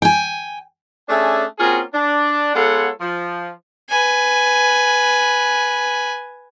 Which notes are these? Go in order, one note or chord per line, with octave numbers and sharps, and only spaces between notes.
G5 G#5
A3 C#4 D4 G#4 E5 G#5
A#3 C4 C#4 F4 F#4 G#4
D4
G#3 B3 F4 A4 C#5 F#5
F3
B4 G#5